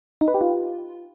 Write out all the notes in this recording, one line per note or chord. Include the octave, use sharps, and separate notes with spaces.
D#4
B4
G4
F4